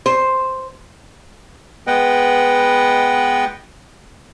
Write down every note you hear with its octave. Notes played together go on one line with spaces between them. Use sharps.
C5
G#3 B3 B4 D#5 F#5 G5